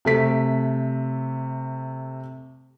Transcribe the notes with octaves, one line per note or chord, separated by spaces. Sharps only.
C3 A3 B6